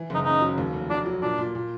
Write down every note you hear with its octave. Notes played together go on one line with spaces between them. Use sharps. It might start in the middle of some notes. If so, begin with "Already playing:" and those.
Already playing: E3
F#1 D#4
C#3 D#4
F#3
D#2
F1
F#3 D4
F#3
A#2 D4
A#2
A#2